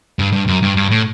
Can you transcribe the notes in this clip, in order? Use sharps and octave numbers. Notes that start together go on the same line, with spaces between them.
G2
G2
F#2
G2
G2
A2